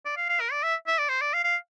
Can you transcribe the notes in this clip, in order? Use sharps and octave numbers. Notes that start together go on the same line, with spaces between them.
D5
F5
F5
A#4
D5
E5
E5
D5
C5
D5
F5
F5